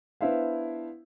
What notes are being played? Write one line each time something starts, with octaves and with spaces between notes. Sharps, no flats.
B3 D4 E4 C5 E5 F5